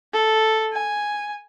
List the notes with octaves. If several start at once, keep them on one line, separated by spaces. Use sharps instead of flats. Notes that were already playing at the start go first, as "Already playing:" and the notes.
A4
G#5